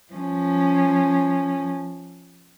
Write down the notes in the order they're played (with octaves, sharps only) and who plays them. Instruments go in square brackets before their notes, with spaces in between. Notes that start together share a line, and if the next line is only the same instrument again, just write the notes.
[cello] F3 C#4